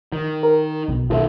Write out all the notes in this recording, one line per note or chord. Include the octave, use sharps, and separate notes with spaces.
D#3
A#4
B1 B2
B1 D#3 F4 A4 E5